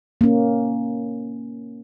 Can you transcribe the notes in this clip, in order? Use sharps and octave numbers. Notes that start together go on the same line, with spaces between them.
A#3 C#4